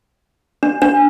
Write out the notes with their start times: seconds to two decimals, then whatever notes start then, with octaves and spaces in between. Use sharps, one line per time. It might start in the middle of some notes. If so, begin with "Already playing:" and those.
0.63 D4
0.82 D4